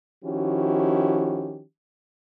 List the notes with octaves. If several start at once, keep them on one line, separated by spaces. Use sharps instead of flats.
D#3 F3 C#4 E4 F#4 G4